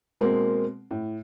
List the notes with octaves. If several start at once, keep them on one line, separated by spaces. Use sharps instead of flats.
B2 G#3 A#3 C4
A2